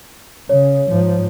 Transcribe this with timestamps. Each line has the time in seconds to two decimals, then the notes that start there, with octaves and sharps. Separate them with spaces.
0.49 C#3 C#5
0.87 G#2 F3